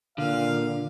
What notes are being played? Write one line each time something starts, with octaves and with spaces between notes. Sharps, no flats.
A#2 D3 F5